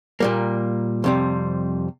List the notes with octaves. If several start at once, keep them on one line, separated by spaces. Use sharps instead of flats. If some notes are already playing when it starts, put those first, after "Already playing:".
A#2 G3 A#3
F2 C3 G3